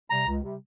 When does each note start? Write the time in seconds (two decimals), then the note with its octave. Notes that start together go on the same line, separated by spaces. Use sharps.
0.10 C3 G3 A#5
0.26 C#2
0.43 C3 G3